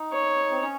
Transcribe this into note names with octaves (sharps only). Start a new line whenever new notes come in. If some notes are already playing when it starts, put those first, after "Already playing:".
Already playing: D#4
C#5
C4
C#4